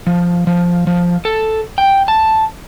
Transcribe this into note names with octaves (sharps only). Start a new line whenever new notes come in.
F3
F3
F3
A4
G5
A5